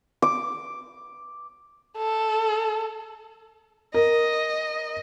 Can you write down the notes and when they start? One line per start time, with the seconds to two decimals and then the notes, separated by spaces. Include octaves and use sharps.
0.22 D6
1.97 A4
3.94 A#4 D#5